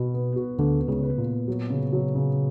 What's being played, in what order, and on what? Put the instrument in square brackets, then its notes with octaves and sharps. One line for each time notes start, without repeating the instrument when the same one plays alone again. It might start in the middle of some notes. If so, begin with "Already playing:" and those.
Already playing: [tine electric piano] B2 [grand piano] B3 F#4
[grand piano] B3
F#4
[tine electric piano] D2 D3 [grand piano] B3
[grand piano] B3
[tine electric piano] C#2 C#3
[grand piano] B4
[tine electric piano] A#2
[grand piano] B3
F#3
C#3
F#3
C#3